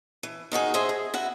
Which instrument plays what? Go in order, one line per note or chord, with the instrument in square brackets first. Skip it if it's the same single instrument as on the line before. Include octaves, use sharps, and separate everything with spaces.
[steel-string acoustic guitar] E3
D#3 D#4 F#4 G#4
G#4 C5 D#5 E5
G#4
E4 F#4 E5